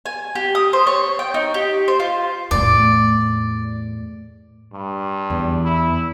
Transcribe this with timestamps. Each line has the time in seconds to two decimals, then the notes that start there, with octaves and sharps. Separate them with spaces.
0.06 G#5
0.35 G4
0.55 D#6
0.73 C5
0.87 C#5
1.19 G5
1.34 D#4
1.54 G4
1.88 C5
2.00 F4
2.51 E2 A2 D5
4.73 G2
5.30 E2
5.64 E4